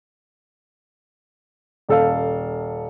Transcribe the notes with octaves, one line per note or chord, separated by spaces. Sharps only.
D#1 A4 F5